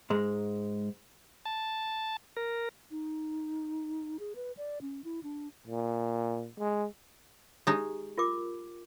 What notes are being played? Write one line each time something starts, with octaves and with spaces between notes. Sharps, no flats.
G#2 G#3
A5
A#4
D#4
G#4
B4
D5
C#4
E4
D4
A#2
G#3
G#3 D#4 G4
F4 A#4 D6